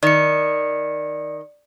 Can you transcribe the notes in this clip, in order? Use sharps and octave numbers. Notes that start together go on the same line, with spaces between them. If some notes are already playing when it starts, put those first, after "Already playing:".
D#3 D5 C#7